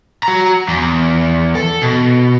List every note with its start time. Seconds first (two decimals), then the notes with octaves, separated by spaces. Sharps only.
0.23 F#4 A#5
0.68 E2
1.55 A4
1.82 B2